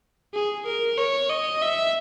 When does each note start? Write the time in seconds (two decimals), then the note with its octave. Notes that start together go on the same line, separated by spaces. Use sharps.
0.34 G#4
0.66 A#4
0.98 C#5
1.29 D#5
1.61 E5